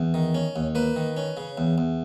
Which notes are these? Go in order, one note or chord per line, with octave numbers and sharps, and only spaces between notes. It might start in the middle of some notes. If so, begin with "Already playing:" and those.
Already playing: E2
D#3
C#4
D#2
A#3 B4
D#3
C#4
C#3
E2
E2